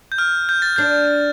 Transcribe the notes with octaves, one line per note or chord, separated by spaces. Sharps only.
G6
F6
G6
A6
D4 G6